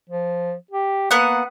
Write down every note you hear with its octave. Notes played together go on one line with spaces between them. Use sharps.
F3
G4
A#3 B3 F#5